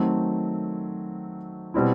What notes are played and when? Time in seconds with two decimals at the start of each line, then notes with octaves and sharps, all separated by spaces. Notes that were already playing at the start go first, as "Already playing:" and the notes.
Already playing: D#3 F#3 A3 C4
1.74 B2 G3 C4 E4